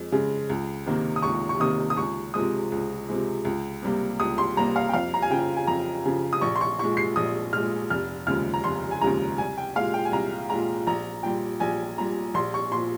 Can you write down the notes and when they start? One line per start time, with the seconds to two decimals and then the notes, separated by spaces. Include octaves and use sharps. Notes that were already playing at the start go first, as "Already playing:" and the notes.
Already playing: F2 G#3
0.12 C#3 G#3
0.50 C#2
0.86 C3 D#3 A#3
1.16 D#6
1.22 C#2 C#6
1.49 C#6
1.60 C3 D#3 A#3 D#6
1.90 D#6
1.97 C#2 C#6
2.34 C3 F3 G#3 D#6
2.72 C#2
3.09 C3 F3 G#3
3.45 C#2
3.82 C3 G3 A#3
4.20 C#2 D#6
4.38 C6
4.57 C3 G3 A#3 A#5
4.76 F5
4.89 G5
4.93 F2 F5
5.14 A#5
5.22 G#5
5.30 C#3 F3 G5
5.57 G#5
5.67 F2 A#5
6.05 C#3 F3
6.33 D#6
6.41 A#1 C#6
6.56 C6
6.61 C#6
6.79 A#2 G#3 C#6
6.97 C7
7.16 A#1 D#6
7.53 A#2 G#3 F6
7.90 F1 F6
8.27 D#2 C#3 F3 G#3 F6
8.54 A#5
8.64 F1 C6
8.91 G#5
9.01 D#2 C#3 F3 G#3 A#5
9.38 C2 G#5
9.58 G5
9.76 A#2 G#3 F5
9.94 G5
10.05 G#5
10.12 C2 A#5
10.50 A#2 G#3 A#5
10.87 A#1 A#5
11.23 A#2 G3 G5
11.60 A#1 G#5
11.98 A#2 G3 A#5
12.34 A#1 C6
12.54 C#6
12.71 A#2 F3 C6